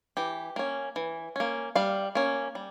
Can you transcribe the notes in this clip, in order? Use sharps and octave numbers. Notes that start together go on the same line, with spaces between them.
E3 G4
A#3 C#4
E3
A#3 C#4
G3 F5
A#3 C#4
G3